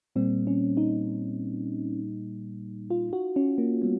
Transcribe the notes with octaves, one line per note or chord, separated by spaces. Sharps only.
A#2 G3 A#3 C4
C#4
D#4
F4
F#4
C#4
A#3
G3 B3